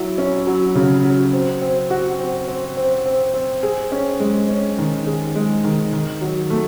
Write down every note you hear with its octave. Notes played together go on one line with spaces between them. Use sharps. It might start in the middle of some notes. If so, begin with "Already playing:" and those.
Already playing: F#3 E4
C#4
F#3
C#3
F#3
C4
C4
F#4
C4
C4
C4
C4
C4
G#4
C#4
G#3
C#4
D#3
G#4
G#3
D#3
D#3
F#3
A3